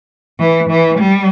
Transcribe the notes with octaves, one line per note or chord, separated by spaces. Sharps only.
E3
E3
G3